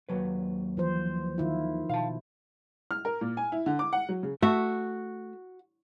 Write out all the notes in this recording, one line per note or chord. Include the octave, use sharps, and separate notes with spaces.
D#2 F#3 B4
E3 F3 C5
D#3 E4 F4
B2 F5 A5
F6
A#4
A#2
G#5
E4
D3
D6
F#5
F#3
C#3
A3 F#4 E5